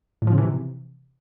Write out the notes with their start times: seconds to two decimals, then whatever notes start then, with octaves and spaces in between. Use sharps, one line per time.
0.22 A2
0.27 F3
0.32 C#3
0.38 E3
0.43 C3